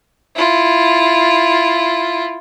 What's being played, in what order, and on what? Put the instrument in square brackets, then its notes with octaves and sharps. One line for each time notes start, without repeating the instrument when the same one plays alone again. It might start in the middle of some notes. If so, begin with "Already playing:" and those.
[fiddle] E4 F4